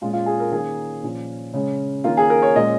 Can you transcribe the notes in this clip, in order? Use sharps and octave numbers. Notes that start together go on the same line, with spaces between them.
A#2 G#3 C#4 F4
F4
G#4
A#4
D#3 A#3 C#4 G#4
A#2 F3 C#4
C#3 G#3 C#4
D#3 A#3 C#4 F4
G#4
A#4
C#5
A#2 G#3 C#4 D#5